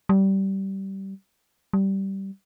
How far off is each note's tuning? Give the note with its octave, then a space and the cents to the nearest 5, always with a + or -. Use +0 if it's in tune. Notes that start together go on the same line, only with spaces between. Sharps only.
G3 -20
G3 -15